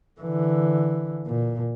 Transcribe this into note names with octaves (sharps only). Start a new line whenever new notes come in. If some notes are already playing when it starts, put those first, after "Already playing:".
D3 E3
A#2